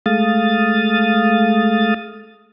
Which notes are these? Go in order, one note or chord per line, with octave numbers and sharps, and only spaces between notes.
G#3 A3 F5 D#6 A6